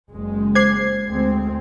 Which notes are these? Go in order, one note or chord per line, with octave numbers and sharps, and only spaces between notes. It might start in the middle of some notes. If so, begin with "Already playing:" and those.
F#1 G#3
C5 D6 G#6 C7
D2 G#3 C4